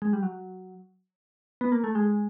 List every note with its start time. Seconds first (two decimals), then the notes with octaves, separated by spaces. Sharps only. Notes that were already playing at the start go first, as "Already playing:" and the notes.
0.02 G#3
0.13 G3
0.23 F#3
1.61 B3
1.72 A#3
1.84 A3
1.95 G#3